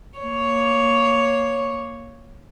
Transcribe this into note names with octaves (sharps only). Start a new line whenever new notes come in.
A#3 C#5